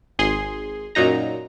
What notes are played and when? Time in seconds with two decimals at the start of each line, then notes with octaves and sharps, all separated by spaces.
0.19 G#1 G#4 C6
0.95 F#2 A#2 F#3 D#4 A#5